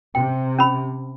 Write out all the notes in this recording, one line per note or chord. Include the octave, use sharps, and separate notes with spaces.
C3 G5
C#4 B5